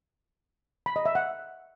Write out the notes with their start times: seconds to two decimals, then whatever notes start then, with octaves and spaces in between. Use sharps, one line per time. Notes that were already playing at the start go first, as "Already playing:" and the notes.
0.86 B5
0.96 D#5
1.06 E5
1.15 F#5